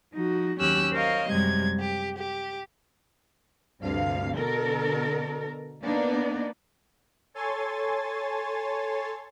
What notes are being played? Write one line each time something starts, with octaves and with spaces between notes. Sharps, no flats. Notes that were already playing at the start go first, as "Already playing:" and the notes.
F3 D#4 F#4
D#2 F#3 C#4 G4 E6 F#6
A#4 C5 C#5 D#5 F5
F#2 C3 G3 G#3 G#6
G4
G4
D2 G2 C3 F5
B2 D3 A4 A#4
A#3 B3 D4 D#4 D5
A4 C#5 G#5 C6 A6